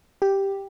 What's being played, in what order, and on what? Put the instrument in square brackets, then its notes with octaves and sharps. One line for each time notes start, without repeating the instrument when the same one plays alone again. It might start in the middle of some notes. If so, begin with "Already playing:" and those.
[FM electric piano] G4